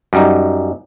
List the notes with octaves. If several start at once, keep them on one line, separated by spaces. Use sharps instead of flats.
F#2 G3 D#4